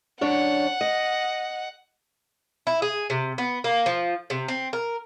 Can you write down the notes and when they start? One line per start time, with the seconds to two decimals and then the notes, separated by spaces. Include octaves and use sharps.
0.21 F#2 D4 C#5 F#5
0.81 D#5
2.67 E4
2.82 G#4
3.10 C3
3.38 B3
3.64 A#3
3.86 F3
4.30 C3
4.48 C4
4.73 A#4